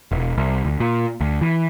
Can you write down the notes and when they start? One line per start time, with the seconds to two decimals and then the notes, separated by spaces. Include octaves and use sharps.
0.11 E1
0.38 C2
0.65 D2
0.80 A#2
1.21 D2
1.41 E3